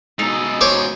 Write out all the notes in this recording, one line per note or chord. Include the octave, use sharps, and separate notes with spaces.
G#2 B2 D#4 A4
C5 C#5 D6